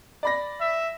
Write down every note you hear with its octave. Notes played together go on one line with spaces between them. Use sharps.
D5 B5 A#6
E5